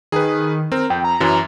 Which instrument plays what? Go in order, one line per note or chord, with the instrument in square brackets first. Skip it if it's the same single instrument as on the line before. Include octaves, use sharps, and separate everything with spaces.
[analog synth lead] D#3 [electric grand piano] G#4 B4
[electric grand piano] C4 [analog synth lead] A#4
[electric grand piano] F2 [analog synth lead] G5
[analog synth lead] A#5
[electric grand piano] F#2 E3 F#3